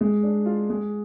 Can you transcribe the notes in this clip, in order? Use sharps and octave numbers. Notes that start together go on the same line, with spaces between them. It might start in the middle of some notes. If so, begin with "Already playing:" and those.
G#3
D4
F4
G#3